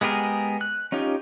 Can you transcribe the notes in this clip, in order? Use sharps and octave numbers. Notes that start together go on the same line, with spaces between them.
G#3 B3 G4 G#4 A#4
F#6
C#4 D#4 F4 G4 C#5